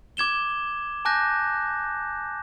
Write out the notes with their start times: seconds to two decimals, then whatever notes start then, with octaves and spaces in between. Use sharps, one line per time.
0.17 D6 G#6 E7 G7
1.05 G#5 A5 D6 F#6 G6 A#6